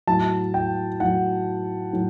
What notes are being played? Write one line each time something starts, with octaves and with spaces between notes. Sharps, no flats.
A2 F#3 A5
G5
A2 F#3 F#5
A2 F#3